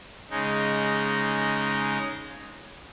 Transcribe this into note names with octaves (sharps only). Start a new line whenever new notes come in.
C#3 G#3 D#4